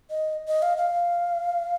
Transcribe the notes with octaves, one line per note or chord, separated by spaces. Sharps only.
D#5
D#5
F5
F5